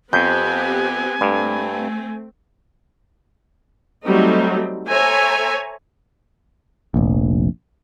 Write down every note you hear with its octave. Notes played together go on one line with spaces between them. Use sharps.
F2 B3 C4 G4 G#5 G6
G2 A3 C4
F#3 G3 A3 C4 D#4
A4 C5 C#5 E5 G#5 A#5
F1 A#1